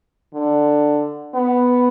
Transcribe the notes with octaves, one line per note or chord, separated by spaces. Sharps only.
D3
B3